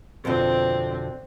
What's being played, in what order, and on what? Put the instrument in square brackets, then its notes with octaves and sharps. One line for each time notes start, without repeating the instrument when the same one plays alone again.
[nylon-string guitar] F2 B2 D3 [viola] C4